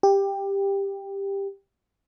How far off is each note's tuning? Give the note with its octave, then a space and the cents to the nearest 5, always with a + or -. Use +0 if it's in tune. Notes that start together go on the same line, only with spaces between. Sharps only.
G4 +10